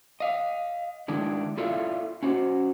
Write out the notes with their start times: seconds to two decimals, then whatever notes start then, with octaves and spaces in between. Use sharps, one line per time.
0.20 D#5 F5
1.08 D#3 G#3 D4 E4
1.57 E4 F4 A4 D5 E5 F5
2.23 C#4 F#4 C5